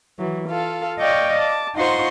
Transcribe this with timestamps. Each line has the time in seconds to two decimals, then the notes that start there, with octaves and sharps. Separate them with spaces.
0.18 E3 F#3
0.48 F4 A4 F5
0.98 D5 D#5 F5 G5 C#6
1.39 A5 D6
1.75 D#4 F4 C5 F#5 C6 C#6